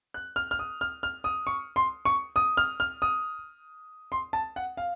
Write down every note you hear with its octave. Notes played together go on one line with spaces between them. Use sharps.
F#6
F6
F6
D#6
F6
F6
D#6
C#6
C6
C#6
D#6
F6
F6
D#6
C6
A5
F#5
F5